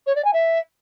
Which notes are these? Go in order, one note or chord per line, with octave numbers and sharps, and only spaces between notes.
C#5
D5
G#5
E5